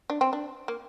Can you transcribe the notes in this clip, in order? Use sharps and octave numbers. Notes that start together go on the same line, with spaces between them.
D4
C4
D4
A#3